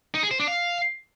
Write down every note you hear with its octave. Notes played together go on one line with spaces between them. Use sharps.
D#4
G#4
C5
D4
F5